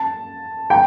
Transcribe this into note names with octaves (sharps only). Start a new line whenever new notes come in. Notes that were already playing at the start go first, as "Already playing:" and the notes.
Already playing: A5
G5